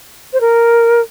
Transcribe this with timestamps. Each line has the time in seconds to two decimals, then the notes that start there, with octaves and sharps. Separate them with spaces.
0.33 C5
0.41 A#4